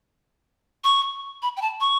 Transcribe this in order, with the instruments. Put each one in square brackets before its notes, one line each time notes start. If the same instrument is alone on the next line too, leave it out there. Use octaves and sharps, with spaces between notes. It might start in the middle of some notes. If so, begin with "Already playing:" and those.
[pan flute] C#6
B5
G5
A5
C#6